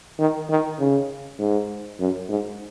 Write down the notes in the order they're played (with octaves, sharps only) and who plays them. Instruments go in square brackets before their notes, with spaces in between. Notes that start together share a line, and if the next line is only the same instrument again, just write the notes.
[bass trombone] D#3
D#3
C#3
G#2
F#2
G#2